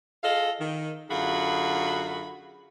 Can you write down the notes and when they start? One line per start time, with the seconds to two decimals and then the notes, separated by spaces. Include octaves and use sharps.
0.23 F4 G#4 A4 D#5 F5
0.60 D#3
1.10 F#2 D3 F4 F#4 G#4 B5